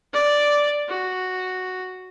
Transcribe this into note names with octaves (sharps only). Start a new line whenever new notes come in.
D5
F#4